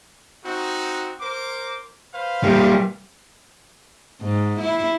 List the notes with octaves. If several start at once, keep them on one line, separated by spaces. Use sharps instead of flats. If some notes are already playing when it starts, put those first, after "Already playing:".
C4 D#4 F#4
A#4 C5 D6
B4 C5 F5
G3 A#3
G#2
E4